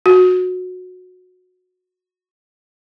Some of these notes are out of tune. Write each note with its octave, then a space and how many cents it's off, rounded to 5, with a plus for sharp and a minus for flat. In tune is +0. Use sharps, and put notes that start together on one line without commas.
F#4 -20